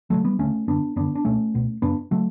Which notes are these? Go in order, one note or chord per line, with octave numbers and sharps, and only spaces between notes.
D2 F#3 A3
C#3
G3 B3
D2 C#3 A3 C#4
F#2 D3 B3 D4
F#2 D3 B3 D4
D4
C#2 B2 A3 C#4
C#2 B2
F#2 C#3 B3 D4
C#3 F#3 A3